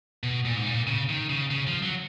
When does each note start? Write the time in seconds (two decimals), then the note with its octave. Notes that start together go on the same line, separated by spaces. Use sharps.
0.23 B2
0.45 A#2
0.56 G#2
0.66 A#2
0.87 C#3
1.09 D#3
1.30 C#3
1.51 C#3
1.67 F3
1.82 F#3